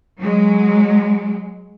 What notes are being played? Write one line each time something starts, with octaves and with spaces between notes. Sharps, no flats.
F#3 G#3